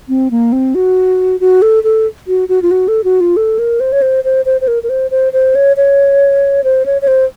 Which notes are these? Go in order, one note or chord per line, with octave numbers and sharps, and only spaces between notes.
C4
A#3
C4
F#4
F#4
A4
A4
F#4
F#4
F4
F#4
A4
F#4
F4
A4
A#4
C5
C#5
C5
C5
C5
C5
A#4
A#4
C5
C5
C5
C#5
C#5
C5
C#5
C#5
C5